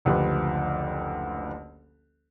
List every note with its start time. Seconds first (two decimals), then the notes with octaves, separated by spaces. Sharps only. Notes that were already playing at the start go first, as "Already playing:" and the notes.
0.05 F#1 D2 F3 G4 B4